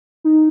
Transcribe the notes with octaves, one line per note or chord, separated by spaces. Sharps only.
D#4